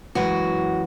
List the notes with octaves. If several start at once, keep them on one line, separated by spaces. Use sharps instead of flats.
F#2 E3 G#3 F#4